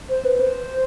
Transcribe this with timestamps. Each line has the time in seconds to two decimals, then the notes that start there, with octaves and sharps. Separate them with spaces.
0.10 C5
0.25 B4
0.40 C5